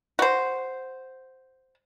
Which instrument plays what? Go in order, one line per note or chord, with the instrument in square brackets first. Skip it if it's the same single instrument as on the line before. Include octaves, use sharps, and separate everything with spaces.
[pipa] F#4 C5